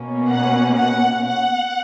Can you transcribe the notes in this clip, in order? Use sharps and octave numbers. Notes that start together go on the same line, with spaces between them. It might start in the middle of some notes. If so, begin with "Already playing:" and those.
Already playing: B2 A#3 C#4
F#5
F#5
F#5